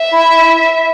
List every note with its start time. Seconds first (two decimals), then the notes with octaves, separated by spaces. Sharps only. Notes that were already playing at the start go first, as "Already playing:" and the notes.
Already playing: E5
0.12 E4